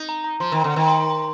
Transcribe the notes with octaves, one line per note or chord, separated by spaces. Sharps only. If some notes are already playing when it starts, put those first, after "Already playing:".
Already playing: D#4
A#5
A#5
F3 C6
D#3
D3
D#3
C6